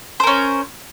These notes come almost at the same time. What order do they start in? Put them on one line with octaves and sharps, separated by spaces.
C5 A#4 C#4